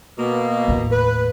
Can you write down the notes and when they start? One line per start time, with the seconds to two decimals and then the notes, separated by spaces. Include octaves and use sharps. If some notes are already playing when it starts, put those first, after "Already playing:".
0.18 B2 A#3
0.68 D#2 A2
0.92 B4